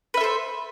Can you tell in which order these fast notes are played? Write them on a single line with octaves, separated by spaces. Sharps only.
B4 E5 A4 C5